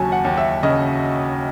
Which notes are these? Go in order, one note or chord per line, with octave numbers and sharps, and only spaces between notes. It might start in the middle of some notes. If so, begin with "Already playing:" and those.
Already playing: D#2 C#3 F#3 G#5 A5
F#5
D#2
E5
C#3 D#5